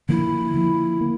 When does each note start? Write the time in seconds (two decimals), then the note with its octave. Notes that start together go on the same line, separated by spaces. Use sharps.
0.09 D3 F3 A#3 E4
0.54 D3 F3 A#3
1.01 A#3